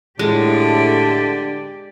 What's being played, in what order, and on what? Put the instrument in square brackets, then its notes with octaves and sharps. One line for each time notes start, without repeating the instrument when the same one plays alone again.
[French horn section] A2 [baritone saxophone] D3 [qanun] G#3 [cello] G4 D5